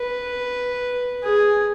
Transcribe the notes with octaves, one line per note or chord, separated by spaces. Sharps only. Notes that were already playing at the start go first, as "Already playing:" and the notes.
Already playing: B4
G#4